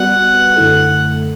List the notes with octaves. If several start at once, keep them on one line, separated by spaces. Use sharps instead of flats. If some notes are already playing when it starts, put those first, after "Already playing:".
Already playing: G3 B3 F#4 B4 D5 F#5
F#2 D3 A3 E4 A4